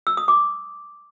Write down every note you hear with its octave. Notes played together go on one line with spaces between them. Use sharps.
E6
D#6
D6